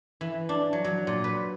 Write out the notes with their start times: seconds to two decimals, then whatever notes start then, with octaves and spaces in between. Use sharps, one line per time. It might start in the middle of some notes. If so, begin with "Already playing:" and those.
0.21 E3
0.49 D4
0.73 F#3
0.84 F#3
1.07 A#2
1.24 B4